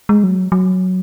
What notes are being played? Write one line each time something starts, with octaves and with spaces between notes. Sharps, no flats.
G#3
F#3
F#3